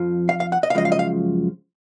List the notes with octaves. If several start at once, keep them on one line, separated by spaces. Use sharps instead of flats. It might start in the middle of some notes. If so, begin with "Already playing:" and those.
Already playing: F2 F3
F5
F5
F#5
D#5
F5
F#2 C#3 F3 G#3 D#5
F5
D#5
F5